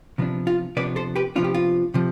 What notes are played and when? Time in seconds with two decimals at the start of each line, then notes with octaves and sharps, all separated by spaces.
0.18 C3 F3 B3 D4
0.47 F4
0.77 C3 F3 B3 D4 B4 D5
0.96 A4 C5
1.16 G4 B4
1.36 C3 F3 B3 D4 F4
1.44 G4
1.54 F4
1.94 C3 F3